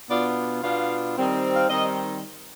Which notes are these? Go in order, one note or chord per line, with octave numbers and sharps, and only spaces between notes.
B2 B3 D4 F4 D5
B2 B3 D4 F4 F5
D#3 G3 C4 D#4
F5
D#3 G3 C4 D#4 D#5